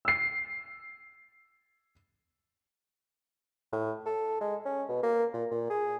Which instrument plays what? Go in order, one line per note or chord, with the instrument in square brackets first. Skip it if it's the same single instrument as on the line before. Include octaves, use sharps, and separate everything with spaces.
[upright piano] E6 C7
[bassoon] A2
A4
G#3
C#4
B2
A#3
A#2
A#2
G#4